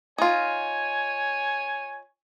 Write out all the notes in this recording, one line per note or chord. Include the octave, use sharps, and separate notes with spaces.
D#4 F4 C#5 G#5